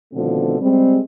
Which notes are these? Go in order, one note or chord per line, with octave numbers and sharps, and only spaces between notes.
B2 D3 D#3 F3 A3 C4
G3 G#3 C4